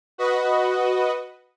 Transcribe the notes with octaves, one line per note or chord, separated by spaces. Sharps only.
F#4 B4 D#5